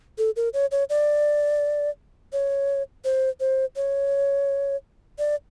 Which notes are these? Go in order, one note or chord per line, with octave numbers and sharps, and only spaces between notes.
A4
A#4
C#5
C#5
D5
C#5
C5
C5
C#5
D5